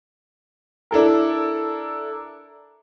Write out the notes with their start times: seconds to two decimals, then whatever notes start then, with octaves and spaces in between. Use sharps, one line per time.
0.91 D4 E4 A4 A#4